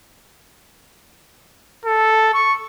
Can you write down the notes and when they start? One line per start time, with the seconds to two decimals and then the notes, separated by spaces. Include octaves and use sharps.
1.85 A4
2.34 C#6